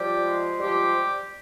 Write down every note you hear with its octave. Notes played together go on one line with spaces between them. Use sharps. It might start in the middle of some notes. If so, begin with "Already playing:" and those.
Already playing: F3 G3 G4
G#3
F3 G3 G4